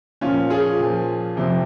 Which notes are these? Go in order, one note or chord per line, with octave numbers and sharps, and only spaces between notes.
A#2 F3 C#4 F4
F4 G#4
A#2 F3
F2 C3 F3